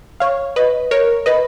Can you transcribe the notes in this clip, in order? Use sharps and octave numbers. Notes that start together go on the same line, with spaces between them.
C#5 F5
B4 D#5
A#4 C#5
B4 D#5